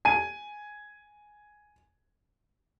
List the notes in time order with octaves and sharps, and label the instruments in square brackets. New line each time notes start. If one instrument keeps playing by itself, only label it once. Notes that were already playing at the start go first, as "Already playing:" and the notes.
[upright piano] G#5 D#7